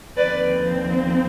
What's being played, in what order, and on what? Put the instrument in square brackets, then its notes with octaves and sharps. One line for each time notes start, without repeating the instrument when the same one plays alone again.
[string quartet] D#2 D3 F3 C4 B4 D5